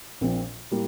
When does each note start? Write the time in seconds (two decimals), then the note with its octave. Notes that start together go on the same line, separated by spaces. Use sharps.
0.21 A#1 A#2 F3 C4
0.71 A2 G3 A#3